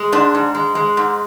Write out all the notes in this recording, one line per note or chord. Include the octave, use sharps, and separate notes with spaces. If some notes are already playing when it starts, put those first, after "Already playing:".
Already playing: G#3
G#2 D4
G#2
G#3
G#3
G#2